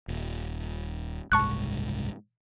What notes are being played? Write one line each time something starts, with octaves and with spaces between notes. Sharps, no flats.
D#1
F#1 C2 G#2 A5 C#6 F#6